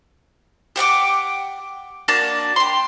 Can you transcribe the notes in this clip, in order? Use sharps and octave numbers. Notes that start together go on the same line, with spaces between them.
G4 F#5 G5 D6
A#3 D4 F#4 A5
G4 C6